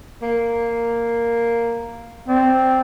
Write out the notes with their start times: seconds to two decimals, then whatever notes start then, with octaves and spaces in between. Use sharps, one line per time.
0.22 A#3
2.28 C4 D5